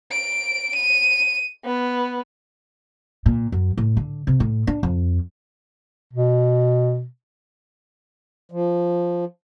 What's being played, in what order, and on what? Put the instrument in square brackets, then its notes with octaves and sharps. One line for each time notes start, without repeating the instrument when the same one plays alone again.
[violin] D7
D#7
B3
[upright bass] A#2
F#2
A2
D3
C3
A2
D4
F2
[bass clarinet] B2
[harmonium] F3